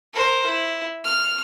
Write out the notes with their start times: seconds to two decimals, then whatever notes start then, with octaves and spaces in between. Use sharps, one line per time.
0.14 A#4 C5
0.46 E4
1.04 F6